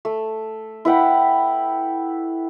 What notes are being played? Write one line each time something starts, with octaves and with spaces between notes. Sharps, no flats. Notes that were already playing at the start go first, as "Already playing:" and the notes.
A3
E4 B4 F#5 G5